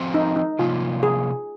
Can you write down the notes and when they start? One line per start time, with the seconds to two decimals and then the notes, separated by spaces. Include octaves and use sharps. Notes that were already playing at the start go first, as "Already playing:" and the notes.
Already playing: F3 C4 F#4 C5
0.14 D#4
0.36 D#4
0.59 C3 F3 A#3 F4
1.03 G#4